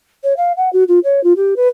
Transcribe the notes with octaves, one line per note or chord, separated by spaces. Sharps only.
C#5
F5
F#5
F#4
F4
C#5
F4
G4
B4